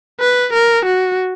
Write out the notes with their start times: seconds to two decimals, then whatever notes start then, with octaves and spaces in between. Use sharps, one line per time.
0.20 B4
0.53 A#4
0.86 F#4